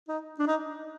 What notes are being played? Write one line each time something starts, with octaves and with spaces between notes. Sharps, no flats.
D#4
D4
D#4